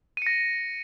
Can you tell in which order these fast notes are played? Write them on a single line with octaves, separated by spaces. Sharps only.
D#7 C#7 A#6